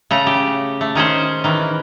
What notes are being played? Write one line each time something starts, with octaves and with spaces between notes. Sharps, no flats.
C#3 A3 A#5
G4
A3
D#3 C#4 G#4 C5
D#3 E3